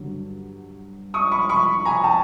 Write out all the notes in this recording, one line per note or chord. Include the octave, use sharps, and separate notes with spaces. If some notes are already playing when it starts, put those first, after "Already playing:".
Already playing: G2 D3 F#3
C#6 D#6
B5 C#6
B5 C#6
G#5 A#5
G5 A5